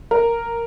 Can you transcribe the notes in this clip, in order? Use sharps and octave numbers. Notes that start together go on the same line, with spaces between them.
A#4